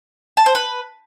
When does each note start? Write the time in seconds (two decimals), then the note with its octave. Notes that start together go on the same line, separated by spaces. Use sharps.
0.37 A5
0.46 C5
0.55 B4